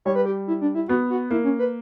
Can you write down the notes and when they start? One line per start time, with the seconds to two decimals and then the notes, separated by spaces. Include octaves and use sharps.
0.05 G3 C#5
0.16 B4
0.26 G4
0.48 E4
0.61 D4
0.75 E4
0.88 B3 F#4
1.10 F#4
1.31 A#3 E4
1.44 C#4
1.59 B4